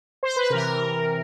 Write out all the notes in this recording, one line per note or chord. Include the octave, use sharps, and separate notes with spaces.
C5
B4
C3 E3 A#4